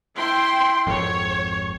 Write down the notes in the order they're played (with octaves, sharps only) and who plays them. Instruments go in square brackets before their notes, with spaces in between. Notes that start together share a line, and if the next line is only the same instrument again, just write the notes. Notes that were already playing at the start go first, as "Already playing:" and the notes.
[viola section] E4 G5 C6
[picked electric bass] G#1 F2 [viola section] C#5